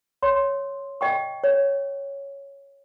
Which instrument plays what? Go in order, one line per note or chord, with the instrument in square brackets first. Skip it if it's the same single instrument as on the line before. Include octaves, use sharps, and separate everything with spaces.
[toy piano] C#5 C6
D#5 G5 C#6
C#5